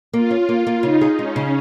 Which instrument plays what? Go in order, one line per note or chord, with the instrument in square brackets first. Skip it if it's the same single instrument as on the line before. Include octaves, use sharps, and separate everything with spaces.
[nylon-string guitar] A#3 [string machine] F4
[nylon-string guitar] C#4
A#3
A#3
[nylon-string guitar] C#3 [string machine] D#4
[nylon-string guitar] G#4
[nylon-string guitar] G#3 [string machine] C#4
[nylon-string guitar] C#3